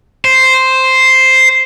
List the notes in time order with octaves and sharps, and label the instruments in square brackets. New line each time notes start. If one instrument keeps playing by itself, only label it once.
[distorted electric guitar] C5